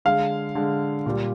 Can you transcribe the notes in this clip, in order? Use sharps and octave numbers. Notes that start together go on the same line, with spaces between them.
D3 G#3 F5
D3 G#3
A#2 G3